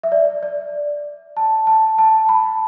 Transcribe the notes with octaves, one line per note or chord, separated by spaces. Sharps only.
E5
D5
D5
A5
A5
A5
B5